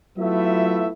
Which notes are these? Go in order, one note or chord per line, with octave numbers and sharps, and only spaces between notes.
F#3 A3 B3 E4 F4 E5